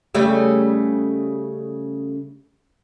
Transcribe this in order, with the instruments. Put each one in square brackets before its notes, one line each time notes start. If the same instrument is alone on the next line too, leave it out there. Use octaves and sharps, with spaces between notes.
[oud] C#3 G3 A3